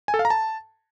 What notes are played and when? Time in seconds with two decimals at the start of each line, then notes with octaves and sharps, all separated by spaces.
0.08 G#5
0.14 A4
0.19 F5
0.25 A#5
0.30 A5